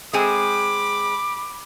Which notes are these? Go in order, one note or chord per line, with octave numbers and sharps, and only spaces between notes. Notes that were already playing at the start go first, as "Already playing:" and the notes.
G#3 C4 G#4 B5 D6